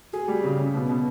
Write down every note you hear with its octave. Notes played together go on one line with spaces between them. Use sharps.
F#4 G#4
G3
C#3
C#3
B2
B2